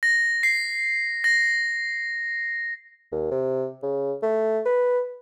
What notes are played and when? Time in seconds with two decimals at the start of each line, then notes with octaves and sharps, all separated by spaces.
0.03 A#6
0.43 C7
1.24 A#6
3.12 D#2
3.31 C3
3.83 C#3
4.23 A3
4.65 B4